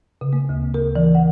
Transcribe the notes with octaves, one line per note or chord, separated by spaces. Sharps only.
C#3
A#3
D2
A#4
E3
F#5